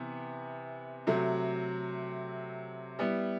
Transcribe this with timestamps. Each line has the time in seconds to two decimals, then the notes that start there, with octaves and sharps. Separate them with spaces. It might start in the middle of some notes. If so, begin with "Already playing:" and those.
Already playing: C3 E3 B3
1.07 C3 F#3 A3
2.99 G3 B3 E4